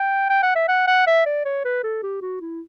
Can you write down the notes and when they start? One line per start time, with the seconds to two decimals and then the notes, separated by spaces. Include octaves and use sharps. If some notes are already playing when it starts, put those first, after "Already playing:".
Already playing: G5
0.30 G5
0.43 F#5
0.55 E5
0.68 F#5
0.87 F#5
1.07 E5
1.26 D5
1.45 C#5
1.65 B4
1.84 A4
2.03 G4
2.21 F#4
2.41 E4